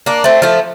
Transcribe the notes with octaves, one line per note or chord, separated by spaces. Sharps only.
A#3 D4
A3 C4
F3 A3